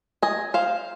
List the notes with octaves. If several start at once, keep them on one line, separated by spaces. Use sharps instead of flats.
D#5 G#5
C5 F5